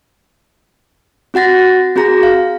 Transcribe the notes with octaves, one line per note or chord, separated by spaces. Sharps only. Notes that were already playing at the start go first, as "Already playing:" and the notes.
C4 F#4 F#5 A6 A#6
C4 F#4 G#4 A#5 A#6
F5